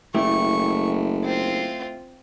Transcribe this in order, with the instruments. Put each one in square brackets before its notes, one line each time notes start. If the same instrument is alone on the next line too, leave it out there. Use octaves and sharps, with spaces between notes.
[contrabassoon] F#1 [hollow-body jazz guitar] A3 E4 G4 [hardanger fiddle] C#6
[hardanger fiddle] C4 F4